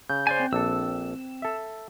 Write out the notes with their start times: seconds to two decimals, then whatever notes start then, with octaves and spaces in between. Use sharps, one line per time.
0.10 C#3 G6
0.27 C5 D5 G#5
0.40 C4
0.53 A#1 D4 A4 E6
1.42 A4 E5